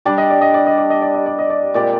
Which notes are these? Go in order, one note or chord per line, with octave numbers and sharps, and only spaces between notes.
G3 D4 G4 D5
D#5
D5
D#5
D5
D#5
D5
D#5
D5
D#5
D5
D#5
D5
A#2 G#3 C4 G4 D5